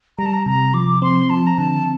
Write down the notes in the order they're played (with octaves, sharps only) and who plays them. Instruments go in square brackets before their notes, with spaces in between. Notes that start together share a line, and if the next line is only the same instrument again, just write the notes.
[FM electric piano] G3 [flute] A#5
[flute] A5
A#5
[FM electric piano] C3 [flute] A#5
[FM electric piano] F3 [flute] D6
[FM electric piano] C4 [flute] C6
[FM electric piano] F3 [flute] A5
[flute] A#5
[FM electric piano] D3 [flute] A5